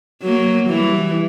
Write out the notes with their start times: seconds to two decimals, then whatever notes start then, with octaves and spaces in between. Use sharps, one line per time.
0.22 F#3 A#3
0.67 E3 G3